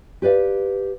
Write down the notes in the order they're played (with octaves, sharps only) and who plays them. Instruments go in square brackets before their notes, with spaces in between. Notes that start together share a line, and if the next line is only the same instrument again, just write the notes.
[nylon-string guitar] G4 B4 D5 F5